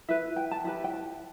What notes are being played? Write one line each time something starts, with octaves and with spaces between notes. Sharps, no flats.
E4 B4 E5
G5
A5
E4 G4 B4 B5
G5
A5